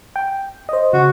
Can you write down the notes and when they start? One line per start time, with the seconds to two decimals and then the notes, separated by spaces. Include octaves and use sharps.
0.16 G5
0.69 C5 D#5
0.93 C#3 F#4